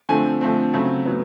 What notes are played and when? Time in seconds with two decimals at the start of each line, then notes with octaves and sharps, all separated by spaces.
0.09 D3 F3 A3 C4 G#5
0.41 D3 F3 A3 C4
0.73 C#3 F#3 A3 C4
1.06 A2 F#3 B3